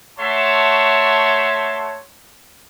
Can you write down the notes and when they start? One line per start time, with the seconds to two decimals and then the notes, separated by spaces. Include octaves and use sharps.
0.19 A3 F#4 C#5 E5 A5 C6